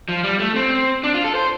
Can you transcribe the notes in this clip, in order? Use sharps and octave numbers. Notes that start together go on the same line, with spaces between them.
F3
G3
A3
C4
D4
F4
A4
C5